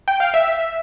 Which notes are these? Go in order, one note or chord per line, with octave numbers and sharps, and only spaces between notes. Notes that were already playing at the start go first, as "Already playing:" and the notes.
G5
F5
E5